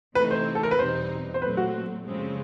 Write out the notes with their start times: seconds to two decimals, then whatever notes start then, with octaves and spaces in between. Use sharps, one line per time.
0.15 C3 E3 A3 C4 D#4 B4
0.31 C5
0.55 A4
0.63 A#4
0.71 B4
0.78 E2 B2 G3 C4 D#4 C5
1.34 C5
1.42 A#2 F#3 A3 C4 B4
1.57 F#4
2.05 F#2 C#3 F3 G#3 C4